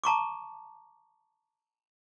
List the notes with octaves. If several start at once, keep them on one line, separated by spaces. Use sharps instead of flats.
A5 A#5 C#6 D6